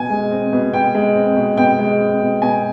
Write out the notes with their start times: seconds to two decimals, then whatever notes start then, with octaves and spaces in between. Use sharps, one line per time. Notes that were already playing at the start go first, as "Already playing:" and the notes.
Already playing: B2 G#5
0.10 G#3
0.31 C4
0.52 B2
0.73 B2 G5
0.95 G#3
1.16 C4
1.36 B2
1.57 B2 G5
1.79 G#3
2.00 C4
2.21 B2
2.42 B2 G#5